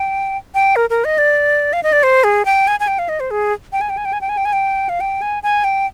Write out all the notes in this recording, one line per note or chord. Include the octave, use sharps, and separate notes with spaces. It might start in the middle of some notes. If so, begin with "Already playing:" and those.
Already playing: G5
G5
A#4
A#4
D#5
D5
F5
D#5
D5
C5
G#4
G5
G#5
G#5
G5
F5
D#5
C5
G#4
G5
G#5
G5
G#5
G5
G#5
G5
G#5
G5
G#5
G5
F5
G5
G#5
G#5
G5